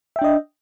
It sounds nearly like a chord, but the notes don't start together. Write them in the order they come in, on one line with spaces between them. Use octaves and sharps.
E5 G5 D4 D#5